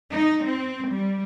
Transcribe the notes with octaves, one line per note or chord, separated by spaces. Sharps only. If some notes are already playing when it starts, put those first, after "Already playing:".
D#4
C4
G3